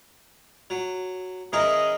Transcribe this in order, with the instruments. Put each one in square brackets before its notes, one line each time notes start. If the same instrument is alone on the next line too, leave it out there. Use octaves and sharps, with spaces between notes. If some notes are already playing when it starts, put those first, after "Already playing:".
[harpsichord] F#3
[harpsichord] E3 C#4 A#4 [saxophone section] G#4 D#5